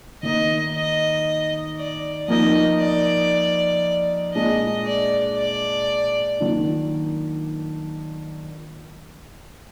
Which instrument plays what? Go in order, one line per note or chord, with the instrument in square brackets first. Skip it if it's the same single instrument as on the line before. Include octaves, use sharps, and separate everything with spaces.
[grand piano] D#3 A#3 D#4 [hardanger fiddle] D#5
[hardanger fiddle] D#5
D5
[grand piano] F3 A#3 D#4 [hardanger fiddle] D#5
[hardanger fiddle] D5
[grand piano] A#2 G#3 D4 [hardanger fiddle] D#5
[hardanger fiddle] D5
D5
[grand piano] D#3 F#3 A#3 D4 F4